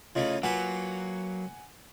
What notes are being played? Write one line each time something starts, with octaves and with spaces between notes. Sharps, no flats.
C#3 E3 A3 F4 D#5
F#3 A#3 F4 B4 F#5 G#5